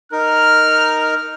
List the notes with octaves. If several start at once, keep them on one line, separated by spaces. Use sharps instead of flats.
D#4 A#4 F6